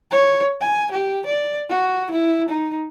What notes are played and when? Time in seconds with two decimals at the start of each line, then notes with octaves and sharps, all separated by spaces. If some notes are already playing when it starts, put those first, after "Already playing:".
0.11 C#5
0.60 G#5
0.91 G4
1.26 D5
1.69 F#4
2.11 E4
2.49 D#4